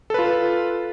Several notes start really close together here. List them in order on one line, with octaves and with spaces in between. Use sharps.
A4 B4 F4